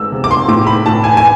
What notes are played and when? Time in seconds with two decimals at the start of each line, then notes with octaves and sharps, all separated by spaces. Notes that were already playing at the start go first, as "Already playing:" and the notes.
Already playing: G#3 E6
0.12 C3
0.24 D6
0.31 C6
0.48 A2 D6
0.67 B5
0.86 A2 A5
1.04 G#5
1.17 G#5